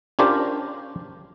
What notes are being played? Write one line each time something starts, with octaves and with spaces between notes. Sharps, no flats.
C#4 D4 F4 G4 A#4 C5